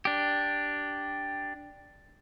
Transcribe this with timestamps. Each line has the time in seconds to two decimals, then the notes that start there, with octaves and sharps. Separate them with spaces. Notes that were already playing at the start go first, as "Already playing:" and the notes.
0.05 D4 G4